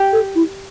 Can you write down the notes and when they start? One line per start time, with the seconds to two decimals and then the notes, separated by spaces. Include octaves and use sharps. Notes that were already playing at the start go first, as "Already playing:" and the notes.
Already playing: G4
0.12 A4
0.35 E4